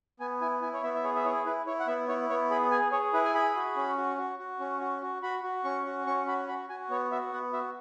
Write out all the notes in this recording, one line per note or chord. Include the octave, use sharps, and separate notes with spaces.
B3 G#5
E4 G#5
E4 G#5
C#5
B3 E5
E5
G#4 C#5
E5
E4 C#5
E4 B4
E4 C#5
F#5
B3 E5
E4 C#5
B3 C#5
G#4 B5
G#4 G#5
G#4 C#5
E4 B4
G#5
G#4 B5
F#4
C#4
F#4
F#4
F#4
C#4
F#4
F#4
F#4 B5
F#4
C#4 C#6
F#4
C#4 C#6
F#4 B5
F#4 B5
F#4 G#5
B3 C#5
F#4 E5
B3 F#5
F#4 E5